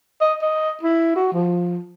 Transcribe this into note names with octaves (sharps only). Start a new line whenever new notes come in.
D#5
D#5
E4
F#4
F3